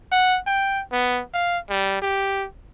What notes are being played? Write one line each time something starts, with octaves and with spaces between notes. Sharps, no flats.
F#5
G5
B3
F5
G3
G4